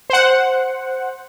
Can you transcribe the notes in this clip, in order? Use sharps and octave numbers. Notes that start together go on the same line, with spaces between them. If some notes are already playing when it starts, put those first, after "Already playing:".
C5 F#5